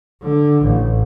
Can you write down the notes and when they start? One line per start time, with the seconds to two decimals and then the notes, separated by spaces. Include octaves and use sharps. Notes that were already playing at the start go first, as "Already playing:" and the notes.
0.22 D3
0.62 A1